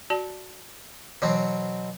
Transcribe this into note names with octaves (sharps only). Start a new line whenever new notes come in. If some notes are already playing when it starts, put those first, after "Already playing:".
F#4 D5 A5
B2 E3 F#3 C4